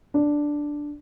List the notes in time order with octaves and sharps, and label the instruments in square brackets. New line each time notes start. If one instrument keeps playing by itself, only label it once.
[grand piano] D4